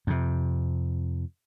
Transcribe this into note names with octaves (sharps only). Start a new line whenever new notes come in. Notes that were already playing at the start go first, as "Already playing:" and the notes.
F2 C3